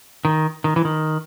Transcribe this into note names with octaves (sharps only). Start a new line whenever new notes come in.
D#3
D#3
E3
D#3